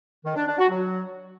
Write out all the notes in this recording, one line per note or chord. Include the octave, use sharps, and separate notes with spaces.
D#3
D4
D4
F#4
F#3